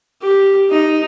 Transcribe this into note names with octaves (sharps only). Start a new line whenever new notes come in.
G4
D#4